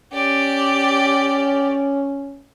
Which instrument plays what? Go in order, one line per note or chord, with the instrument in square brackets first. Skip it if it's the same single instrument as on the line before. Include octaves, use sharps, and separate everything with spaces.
[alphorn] C#4 [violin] G4 D5